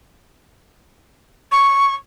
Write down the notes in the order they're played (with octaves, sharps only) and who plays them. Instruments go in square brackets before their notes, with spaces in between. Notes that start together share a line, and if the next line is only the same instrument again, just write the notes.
[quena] C#6